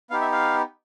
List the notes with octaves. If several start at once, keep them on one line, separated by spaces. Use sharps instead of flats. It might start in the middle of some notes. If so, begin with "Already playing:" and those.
B3 D#4 G4 F5
E5
F5